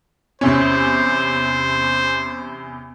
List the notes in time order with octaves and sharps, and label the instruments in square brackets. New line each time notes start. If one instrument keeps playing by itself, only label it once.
[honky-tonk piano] E2 C3 C#4 [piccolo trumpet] C5